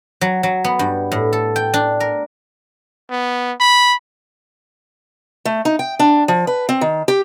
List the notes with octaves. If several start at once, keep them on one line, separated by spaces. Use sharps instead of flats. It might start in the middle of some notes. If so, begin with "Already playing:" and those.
F#3
F#3
B3
G2
A2
A4
G5
D4
A#4
B3
B5
A3
D#4
G5
D4
F3
B4
C4
D#3
G4